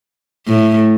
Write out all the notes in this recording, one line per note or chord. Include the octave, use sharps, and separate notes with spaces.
A2